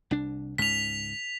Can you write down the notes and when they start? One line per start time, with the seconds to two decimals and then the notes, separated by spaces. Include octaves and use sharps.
0.11 C2 D4
0.58 C#2 G#2 C#3 B6 F7